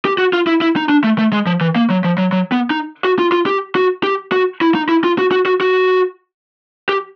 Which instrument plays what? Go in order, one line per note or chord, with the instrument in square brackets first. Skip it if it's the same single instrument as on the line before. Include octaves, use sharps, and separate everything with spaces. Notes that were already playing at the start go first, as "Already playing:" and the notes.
[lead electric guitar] G4
F#4
F4
E4
E4
D#4
D4
A3
A3
G#3
F3
E3
A#3
F#3
F3
F#3
F#3
B3
D#4
F#4
F4
F4
G4
F#4
G4
F#4
E4
D#4
E4
F4
F#4
F#4
F#4
F#4
G4